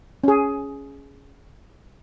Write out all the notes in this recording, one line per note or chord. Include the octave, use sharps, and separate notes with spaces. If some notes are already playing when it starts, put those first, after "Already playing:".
C#4 G#4